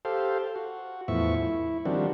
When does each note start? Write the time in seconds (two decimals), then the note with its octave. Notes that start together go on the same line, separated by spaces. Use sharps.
0.05 G4 A4 C5 F5
0.56 F#4
1.08 E2 A2 F3 E5 C#6
1.36 E4
1.86 D#3 F3 G3 C4 D4 F#4